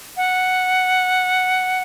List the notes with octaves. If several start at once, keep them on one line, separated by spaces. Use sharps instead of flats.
F#5